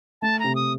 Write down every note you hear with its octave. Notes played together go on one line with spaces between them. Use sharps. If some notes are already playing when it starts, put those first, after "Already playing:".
A3 A5
C3 A#5
D#6